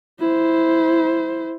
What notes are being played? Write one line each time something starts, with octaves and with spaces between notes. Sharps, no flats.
E4 C5